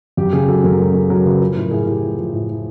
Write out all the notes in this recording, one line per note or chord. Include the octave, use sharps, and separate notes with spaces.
F#2 G4
C#3 G#4
F#3 A4
F#2 A#4
F#3 A4
F#2 G#4
F#3 A#4
C#3 B4
F3 B4
A2 A#4
A2 G#4
A2 G4
F3
F3
A2
F3